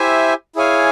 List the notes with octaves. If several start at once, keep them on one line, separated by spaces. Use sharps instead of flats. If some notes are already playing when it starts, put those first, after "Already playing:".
Already playing: E4 G4 C5 E5 G#5
E4 G#4 C#5 F5 G#5